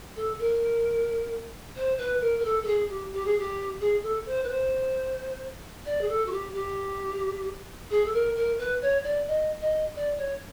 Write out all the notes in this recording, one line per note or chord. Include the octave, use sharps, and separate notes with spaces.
A4
A#4
C5
B4
A#4
A#4
A4
A4
G#4
G4
G4
G#4
G4
G#4
A4
C5
B4
C5
D5
G#4
A4
F#4
G4
G4
G#4
A4
A#4
A#4
B4
C#5
D5
D#5
D#5
D5
C#5